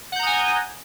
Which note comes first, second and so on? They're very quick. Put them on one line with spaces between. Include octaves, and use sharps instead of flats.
F#5 G6 A#5 D#6 G#5